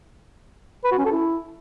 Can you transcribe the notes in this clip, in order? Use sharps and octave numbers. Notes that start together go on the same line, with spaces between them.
B4
F#4
C#4
A4
E4